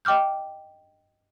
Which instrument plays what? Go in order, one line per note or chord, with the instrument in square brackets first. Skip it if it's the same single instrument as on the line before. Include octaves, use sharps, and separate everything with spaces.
[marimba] D#5 G5 D6 F6 G6